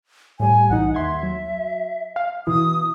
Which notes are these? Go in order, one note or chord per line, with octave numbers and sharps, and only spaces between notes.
A2 G3 G#5
B1 E3 D#4 F#5
D#2 E5 C6 G#6
F#3
F5
B2 E3 E4 D#6